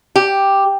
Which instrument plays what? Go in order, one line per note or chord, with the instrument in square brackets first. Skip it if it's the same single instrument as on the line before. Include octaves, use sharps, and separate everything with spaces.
[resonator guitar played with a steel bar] G4